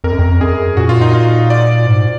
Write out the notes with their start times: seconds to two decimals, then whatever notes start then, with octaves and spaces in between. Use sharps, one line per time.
0.04 F2 A#4
0.12 F#2
0.19 F2
0.40 F#2 G#4
0.77 A#2 F#4
0.89 F4
1.01 D#4
1.14 F4
1.50 D5
1.87 G#2